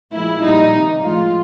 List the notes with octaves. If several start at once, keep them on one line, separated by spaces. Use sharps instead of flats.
A#2 F3 G#3 E4
A#2 G3 D#4
C3 D#3 G3
A2 F3 G#3 F4